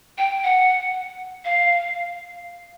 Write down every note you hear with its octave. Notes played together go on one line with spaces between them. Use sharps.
G5
F#5
F5